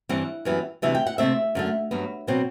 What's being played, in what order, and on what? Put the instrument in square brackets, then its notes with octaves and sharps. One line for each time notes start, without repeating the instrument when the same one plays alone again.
[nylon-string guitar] G2 E3 G3 C4 F#5
F#2 E3 G3 B3
D2 C3 E3 G3 E5
G5
F#5
C3 E3 A3 C4 E5
F#2 D3 A3
G2 F#3 B3
B2 F#3 C4